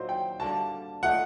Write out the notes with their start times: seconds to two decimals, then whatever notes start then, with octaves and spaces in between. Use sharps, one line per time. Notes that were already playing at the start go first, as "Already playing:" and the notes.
Already playing: A#2 F#3 C4 D#4 C5
0.09 G5
0.40 D3 G3 A#3 F#4 A5
1.03 A#2 A3 D#4 F#5